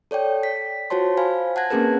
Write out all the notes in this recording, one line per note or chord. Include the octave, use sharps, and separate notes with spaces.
A4 C#5 D5 G5
B6
F4 F#4 C5 C#5 A5 C6
C5 F5 G#5 B5
F#5 A5 F#6 G#6 A#6
A#3 C4 C#4 G#4 A#4 B4